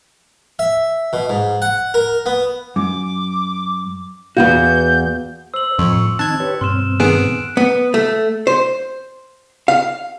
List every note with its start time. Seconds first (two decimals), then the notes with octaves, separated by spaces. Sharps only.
0.59 E5
1.13 B2
1.29 G#2
1.62 F#5
1.94 A#4
2.26 B3
2.76 F#2 D6
4.37 E2 B3 F#4 B4 F5 G6
5.54 C5 E6 F#7
5.78 F2 A2 F3 C6 C#6
6.19 D#3 C4 D#4 A5 F#6 G#6
6.40 G4 B4 C#5
6.61 G2 B2 C4 C6 F6 E7
7.00 D#3 B3 G#4 F#6 D7 E7
7.57 B3
7.94 A3
8.47 C5
9.68 F5